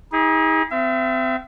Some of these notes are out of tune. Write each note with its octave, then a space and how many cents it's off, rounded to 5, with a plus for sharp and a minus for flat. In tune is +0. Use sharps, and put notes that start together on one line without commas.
D#4 +40 G#4 -30
C4 -30 E5 +35